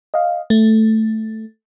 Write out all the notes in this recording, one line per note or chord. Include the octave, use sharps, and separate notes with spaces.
D#5 F5
A3